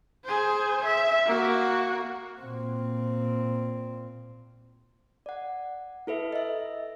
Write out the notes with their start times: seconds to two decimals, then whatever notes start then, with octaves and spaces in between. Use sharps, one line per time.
0.24 G#4 C5
0.84 E5
1.25 A#3 F#4
2.41 A#2 C4
5.26 D5 F#5
6.07 E4 A4 B4 E5
6.33 D#5 E5